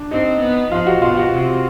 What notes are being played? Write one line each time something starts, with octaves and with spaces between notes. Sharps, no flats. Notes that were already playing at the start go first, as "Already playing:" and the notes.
Already playing: D4
C4 D#4
B3
F3 F4
F#4
B2 F4
F#4
C3